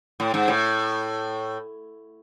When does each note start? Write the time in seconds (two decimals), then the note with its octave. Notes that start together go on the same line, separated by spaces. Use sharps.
0.20 A2
0.34 G#2
0.48 A2